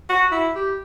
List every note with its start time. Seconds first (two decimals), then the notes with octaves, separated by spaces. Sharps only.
0.09 F#4
0.31 E4
0.55 G4